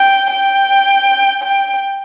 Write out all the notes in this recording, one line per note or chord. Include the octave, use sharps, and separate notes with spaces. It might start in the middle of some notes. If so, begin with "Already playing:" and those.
Already playing: G5
G5
G5